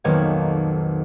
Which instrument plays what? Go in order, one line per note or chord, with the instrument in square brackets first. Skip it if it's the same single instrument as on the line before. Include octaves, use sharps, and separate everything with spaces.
[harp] B1 F2 D#3 A#3 B3 C#5